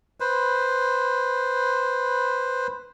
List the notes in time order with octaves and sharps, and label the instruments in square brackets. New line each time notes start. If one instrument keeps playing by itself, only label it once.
[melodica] B4 C5